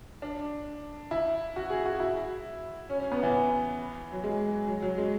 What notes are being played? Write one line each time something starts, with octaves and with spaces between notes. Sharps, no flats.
D4
E4
F#4
G#4
F#4
E4
C#4
C#4
B3
E3
F#3
G#3
F#3
F#3
G#3